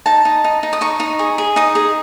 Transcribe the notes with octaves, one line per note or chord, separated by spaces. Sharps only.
D#4 A5
D#4
D#4
D#4
D#6
D#4 C#6
D#4
G#4
G#4
D#4 D#6
G#4